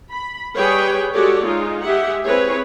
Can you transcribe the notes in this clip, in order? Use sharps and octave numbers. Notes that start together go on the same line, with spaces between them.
B5
G3 G#4 B4 C#5 G5
G#3 F#4 G4 A4 C#5 D5
G#3 D#4 F4
G#3 G4 G#4 E5 F#5
C4 E4 G#4 B4 C#5